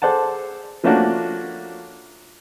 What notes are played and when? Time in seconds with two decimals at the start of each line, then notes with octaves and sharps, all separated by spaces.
0.02 G#4 A4 C5 D5 F#5 A5
0.84 F3 A3 A#3 C#4 D4 F#4